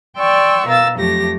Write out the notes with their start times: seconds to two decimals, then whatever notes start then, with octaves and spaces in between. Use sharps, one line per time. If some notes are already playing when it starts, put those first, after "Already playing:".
0.17 D5 G5 C6 C#6 E6
0.67 B2 A#4 F5 E6 A6
0.97 F2 F#3 A3 G4 A#6